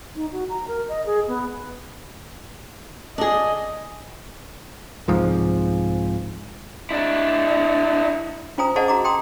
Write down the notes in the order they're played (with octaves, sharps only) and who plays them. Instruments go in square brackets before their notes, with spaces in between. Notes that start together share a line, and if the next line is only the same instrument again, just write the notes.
[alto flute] D#4
F#4
A#5
A#4
D#5
G#4
B3
[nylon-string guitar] D4 G#4 [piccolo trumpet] D#5
[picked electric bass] C2 G#2 F3
[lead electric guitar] D4 E4
[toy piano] C#4 F4 C5 G#5 A#5 D#6
G#4 C5 D5 D#5 F#5 A5
F#4 A#5 D6
G5 A#5 C6 D#6